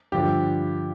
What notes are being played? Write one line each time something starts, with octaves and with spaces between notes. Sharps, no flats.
G2 D3 F3 G4